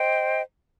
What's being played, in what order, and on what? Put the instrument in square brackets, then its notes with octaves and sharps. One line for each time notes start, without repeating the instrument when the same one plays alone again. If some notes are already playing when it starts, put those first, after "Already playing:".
Already playing: [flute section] C5 D#5 G5